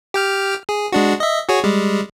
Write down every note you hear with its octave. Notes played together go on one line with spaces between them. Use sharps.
G4 G5 F6
G#4
G#3 D4 F#4
D#5 E5
F#4 G#4 C#5
G3 G#3